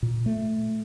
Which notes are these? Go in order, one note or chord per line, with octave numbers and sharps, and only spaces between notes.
A#2
A3